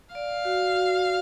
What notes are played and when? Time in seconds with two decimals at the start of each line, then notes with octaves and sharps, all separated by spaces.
0.15 D5 F5
0.45 F#4
0.75 F#4
1.05 F#4